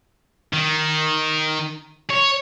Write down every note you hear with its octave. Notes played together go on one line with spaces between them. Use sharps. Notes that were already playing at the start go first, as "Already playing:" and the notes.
D#3
C#5